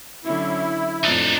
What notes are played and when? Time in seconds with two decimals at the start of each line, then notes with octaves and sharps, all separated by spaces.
0.24 D3 F#3 C#4 E4
1.03 F2 A2 F3 D4 D#4